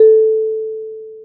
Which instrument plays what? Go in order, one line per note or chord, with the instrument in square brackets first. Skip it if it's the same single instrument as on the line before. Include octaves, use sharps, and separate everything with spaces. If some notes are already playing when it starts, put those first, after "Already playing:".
Already playing: [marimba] A4